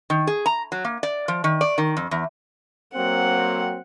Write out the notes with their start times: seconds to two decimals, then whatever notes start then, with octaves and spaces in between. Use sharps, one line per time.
0.10 D#3
0.27 G#4
0.46 A#5
0.72 F#3
0.85 A#3
1.03 D5
1.28 F3
1.44 D#3
1.61 D5
1.78 D#3
1.97 F2
2.11 E2
2.94 F#3 A#3 C4 F#5